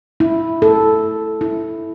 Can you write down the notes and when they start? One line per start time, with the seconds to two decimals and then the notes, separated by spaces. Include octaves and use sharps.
0.20 E4
0.62 A4
1.41 E4